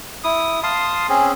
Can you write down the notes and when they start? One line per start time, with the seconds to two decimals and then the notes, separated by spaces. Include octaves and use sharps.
0.24 E4 D#6
0.63 F5 A5 C6 D#6
1.09 C4 C#4 G#4